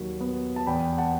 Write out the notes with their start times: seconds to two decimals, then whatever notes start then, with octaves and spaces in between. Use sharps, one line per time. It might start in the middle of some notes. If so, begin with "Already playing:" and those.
Already playing: D#2 D#3 F#3
0.21 B3
0.56 A5
0.67 E2 G5 B5
0.98 F#5 A5